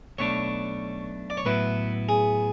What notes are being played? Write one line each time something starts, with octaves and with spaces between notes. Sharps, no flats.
B1 B2 A3 D4 C#5
D5
C#5
A2 F#3 B3 E4 B4
G#4